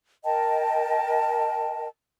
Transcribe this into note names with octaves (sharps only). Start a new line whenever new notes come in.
A#4 D#5 G5 A5